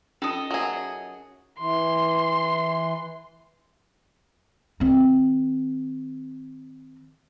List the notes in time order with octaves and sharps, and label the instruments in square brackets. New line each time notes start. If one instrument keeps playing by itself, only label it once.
[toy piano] C#4 D#4 F4 [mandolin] A4 D#5
[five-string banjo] F#3 G#4 [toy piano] F4 A#4 E5
[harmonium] E3 [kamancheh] C6
[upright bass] D#3 C4